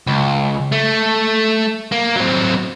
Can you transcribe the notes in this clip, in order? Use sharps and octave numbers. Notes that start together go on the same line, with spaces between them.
C#2
A3
A#3
F#3 C4